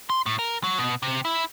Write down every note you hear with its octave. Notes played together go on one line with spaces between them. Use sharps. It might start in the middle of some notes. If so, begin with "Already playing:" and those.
C6
A2
A#4
F#3
B2
C3
E4